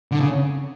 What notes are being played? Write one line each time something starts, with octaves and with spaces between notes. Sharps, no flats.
D3
C#3